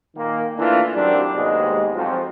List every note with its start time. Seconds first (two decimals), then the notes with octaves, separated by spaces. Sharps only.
0.16 A#2 D#3 A#3
0.57 E3 A3 A#3 D4 E4 F4
0.93 G#1 F#2 F#3 G3 C4 D4
1.34 D#2 G#2 B2 G3 G#3
1.94 F2 F3 F#3